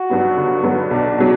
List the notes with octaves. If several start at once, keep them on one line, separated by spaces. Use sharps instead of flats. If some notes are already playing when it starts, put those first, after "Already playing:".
Already playing: F#4
G2 F#3 B3
G1
G2 F#3 B3
B1 D4
B2 F#3